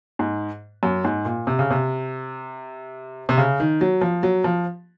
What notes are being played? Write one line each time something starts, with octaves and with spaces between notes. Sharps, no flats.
G#2
F#2
G#2
A#2
C3
C#3
C3
C3
C#3
D#3
F#3
F3
F#3
F3